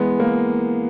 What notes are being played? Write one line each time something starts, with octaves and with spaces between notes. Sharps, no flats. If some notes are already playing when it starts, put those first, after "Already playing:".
Already playing: E3 G#3 B3
A#3